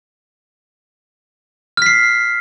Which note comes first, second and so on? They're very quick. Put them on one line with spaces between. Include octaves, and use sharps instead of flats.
F6 B6 C7